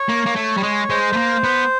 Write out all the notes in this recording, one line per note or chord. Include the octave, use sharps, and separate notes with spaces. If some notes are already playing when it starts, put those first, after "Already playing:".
Already playing: C#5
A#3
A#3
A3
G3
G#3
G#3 C5
A3
A#3
B3